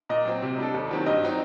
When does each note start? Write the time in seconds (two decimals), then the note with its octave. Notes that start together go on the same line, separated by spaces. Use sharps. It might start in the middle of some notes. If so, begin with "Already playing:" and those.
0.09 A#2 D#5
0.25 F#3 C4
0.42 C3
0.58 G3 D4 A4
0.74 D#2
0.91 D#3 F#3 C4 G4
1.06 G2 D#5
1.23 F#3 C4 D#4